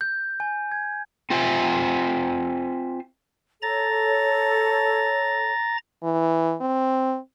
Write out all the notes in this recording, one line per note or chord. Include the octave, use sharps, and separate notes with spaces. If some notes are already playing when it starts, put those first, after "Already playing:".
G6
G#5
G#6
C4 F4 C5 E5 G#5
A4 C#5 A#5 A6
E3
C4